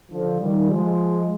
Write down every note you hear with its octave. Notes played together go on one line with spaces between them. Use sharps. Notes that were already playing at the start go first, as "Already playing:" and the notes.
D3 F3
D#3 G3
F3 G#3